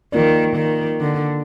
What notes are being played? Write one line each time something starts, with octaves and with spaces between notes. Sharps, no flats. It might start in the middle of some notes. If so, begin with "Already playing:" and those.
D#3 F3 A#3 F4 A#4 D5
D#3
D3